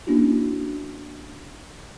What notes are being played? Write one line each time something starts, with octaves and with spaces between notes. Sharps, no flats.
A#3 C#4 D4 E4 F#4